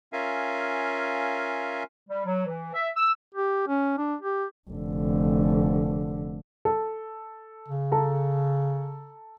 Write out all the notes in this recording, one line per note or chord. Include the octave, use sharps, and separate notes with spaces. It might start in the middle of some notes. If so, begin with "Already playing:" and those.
C#4 F4 A#4 E5 F5 G#5
G3
F#3
E3
E5
E6
G4
C#4
D4
G4
F1 D3
A4
C#3
A4 A5 A#5